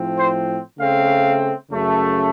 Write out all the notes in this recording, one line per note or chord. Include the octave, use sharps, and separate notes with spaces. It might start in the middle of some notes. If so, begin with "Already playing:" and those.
Already playing: A2 F3 C4
C5
C#3 A3 C4 F5
F#2 C#3 A3